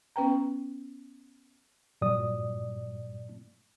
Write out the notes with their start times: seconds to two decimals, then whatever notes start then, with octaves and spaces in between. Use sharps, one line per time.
0.16 B3 C#4 B4 G5 A#5
2.02 G2 A#2 F#3 D5 D#6